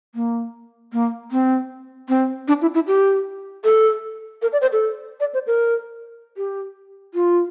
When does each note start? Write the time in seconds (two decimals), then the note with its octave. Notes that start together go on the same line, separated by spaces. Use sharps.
0.15 A#3
0.93 A#3
1.32 C4
2.09 C4
2.48 D4
2.62 E4
2.74 E4
2.87 G4
3.64 A4
4.42 A#4
4.53 D5
4.62 C5
4.72 A4
5.20 D5
5.34 C5
5.47 A#4
6.37 G4
7.14 F4